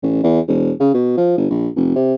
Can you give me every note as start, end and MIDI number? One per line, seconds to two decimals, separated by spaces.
0.02 0.20 33
0.23 0.40 40
0.48 0.71 28
0.80 0.91 49
0.94 1.16 47
1.17 1.37 53
1.37 1.45 31
1.50 1.68 34
1.76 1.92 29
1.95 2.14 48